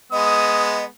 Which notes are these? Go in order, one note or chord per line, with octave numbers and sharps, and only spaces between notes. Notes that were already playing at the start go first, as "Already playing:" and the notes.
G#3 B3 D#5 D#6